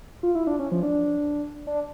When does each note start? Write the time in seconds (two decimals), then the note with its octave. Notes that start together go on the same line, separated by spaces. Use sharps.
0.23 F4
0.35 E4
0.47 D4
0.59 C#4
0.72 F3
0.83 D4
1.67 D4